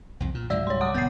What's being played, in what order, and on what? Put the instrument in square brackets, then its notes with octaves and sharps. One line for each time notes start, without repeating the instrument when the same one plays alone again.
[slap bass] C2 F2
A#2
[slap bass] C#2 G#2 F#3 [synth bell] D5 E6 [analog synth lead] E5
[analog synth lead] G3 [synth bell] C#5 C6
[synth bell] F#5 D6 D#6
[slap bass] E1 D2 [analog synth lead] B3 [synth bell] G6 A6 C7